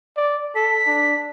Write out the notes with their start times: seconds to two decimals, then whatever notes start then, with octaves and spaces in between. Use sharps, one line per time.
0.17 D5
0.55 A4 B6
0.87 D4